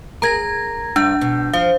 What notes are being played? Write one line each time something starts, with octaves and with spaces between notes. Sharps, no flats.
G#4 A#4 A#5 G#6 A#6
G2 D4 G6
B2
F3 F5